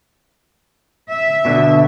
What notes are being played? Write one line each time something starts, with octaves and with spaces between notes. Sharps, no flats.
E5
B2 D3